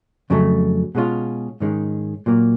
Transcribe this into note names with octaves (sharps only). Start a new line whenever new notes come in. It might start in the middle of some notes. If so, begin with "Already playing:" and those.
F2 C#3 F#3 A3
B2 G#3 C#4 F4
G#2 D#3 G#3 C#4
A#2 F#3 A#3